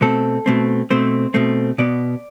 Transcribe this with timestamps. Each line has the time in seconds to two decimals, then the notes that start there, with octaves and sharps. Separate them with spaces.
0.01 B2 A3 C4 A4
0.46 B2 A3 C4
0.90 B2 A3 C4 C5
1.34 B2 A3 C4
1.78 B2 B3 D5